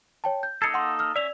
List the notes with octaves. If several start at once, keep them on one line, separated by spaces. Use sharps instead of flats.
C#5 G5 A5
G6
A#3 D#4 A4 G#6 C7 C#7
F#5 C6
E6 F6
C#4 D5 E5 F7